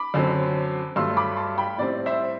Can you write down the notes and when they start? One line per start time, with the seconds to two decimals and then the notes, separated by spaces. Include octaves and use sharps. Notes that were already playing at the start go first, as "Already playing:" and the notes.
Already playing: B5 D6
0.14 F#2 D3 F#3 C4
0.96 G2 F#3 A3 C6 E6
1.17 B5 D6
1.37 A5 C6
1.58 G5 B5
1.78 A2 G3 C4 D5
2.06 C5 E5